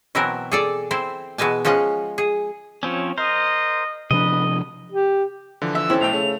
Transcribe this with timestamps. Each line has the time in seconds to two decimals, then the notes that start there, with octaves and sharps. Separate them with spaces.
0.15 B2 E3 F#3 C4 E4 A#4
0.52 G#4 A4 D5
0.91 C4 E4 C5
1.38 B2 E3 G#3 G#5 A5
1.65 F3 G#3 C#4 F4 F#5
2.18 G#4
2.83 F3 C4 C#4 C#5
3.18 A#4 C5 D#5
4.11 C3 F3 D4 B4 D#5
4.92 G4
5.62 D3 E3 F3
5.75 E5 E6
5.90 D#2 C4 C#4 E4 A4
6.01 B1 A3 G5 F7
6.13 C#3 A3